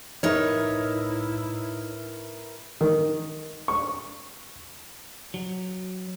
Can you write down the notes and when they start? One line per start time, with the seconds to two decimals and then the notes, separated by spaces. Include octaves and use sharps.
0.23 A2 D#4 E4 A#4 B4 C#5 E5
2.81 D#3
3.68 C#6
5.34 F#3